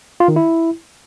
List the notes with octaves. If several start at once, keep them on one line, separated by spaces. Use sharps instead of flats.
F4
D#3
E4